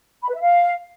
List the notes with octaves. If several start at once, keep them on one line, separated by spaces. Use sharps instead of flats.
B5
B4
E5
F5